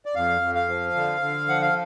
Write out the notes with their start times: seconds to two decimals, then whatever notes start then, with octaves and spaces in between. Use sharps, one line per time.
0.06 D5
0.15 F2 F5
0.41 F2
0.55 F5
0.68 F3
0.95 D3
1.21 D3
1.48 F3 F#5
1.62 F5